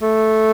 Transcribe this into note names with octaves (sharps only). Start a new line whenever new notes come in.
A3